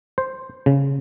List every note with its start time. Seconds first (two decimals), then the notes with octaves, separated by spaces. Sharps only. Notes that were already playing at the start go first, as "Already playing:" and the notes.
0.18 C5
0.66 C#3